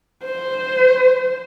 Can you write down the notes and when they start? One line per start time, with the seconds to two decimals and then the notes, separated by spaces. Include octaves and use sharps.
0.25 C5